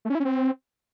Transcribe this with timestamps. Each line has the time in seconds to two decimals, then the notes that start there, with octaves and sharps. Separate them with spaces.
0.05 A3
0.10 C#4
0.15 E4
0.20 C#4
0.25 C4